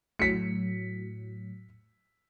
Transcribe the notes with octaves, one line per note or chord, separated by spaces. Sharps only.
A2 F#3 B6 C#7